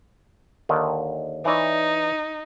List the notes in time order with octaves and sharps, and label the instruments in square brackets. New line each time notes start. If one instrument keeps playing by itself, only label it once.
[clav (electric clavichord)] D#2 D3 D#3
[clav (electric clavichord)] E3 C#5 D5 [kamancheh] D#4